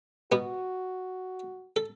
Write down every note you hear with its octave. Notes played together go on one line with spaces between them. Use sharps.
B2 B3 F#4
A4